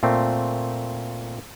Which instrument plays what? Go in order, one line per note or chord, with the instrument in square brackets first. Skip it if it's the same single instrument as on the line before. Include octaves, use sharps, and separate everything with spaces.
[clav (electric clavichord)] A#2 A3 C4